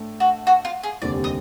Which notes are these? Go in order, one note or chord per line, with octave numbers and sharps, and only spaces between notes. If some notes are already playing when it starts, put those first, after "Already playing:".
Already playing: A2 A3 D4
F#4
F#4
F4
G#4
F1 D#2 D3 G3 C4 D5
D#5